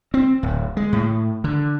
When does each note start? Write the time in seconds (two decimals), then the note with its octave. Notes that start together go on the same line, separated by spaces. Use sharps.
0.14 C4
0.43 D1
0.77 G#3
0.93 A2
1.44 D3